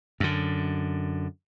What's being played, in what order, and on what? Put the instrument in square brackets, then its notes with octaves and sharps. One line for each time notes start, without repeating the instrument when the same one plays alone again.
[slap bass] F#2 D3